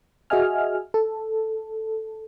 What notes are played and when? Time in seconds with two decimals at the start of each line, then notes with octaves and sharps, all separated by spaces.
0.30 F#4 G#4 D#5 E5 G#5 F6
0.94 A4